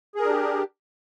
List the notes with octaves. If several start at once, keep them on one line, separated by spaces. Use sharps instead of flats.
D4 G4 G#4 A#4